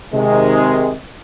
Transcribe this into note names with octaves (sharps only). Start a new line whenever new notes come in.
C3 D#3 G#3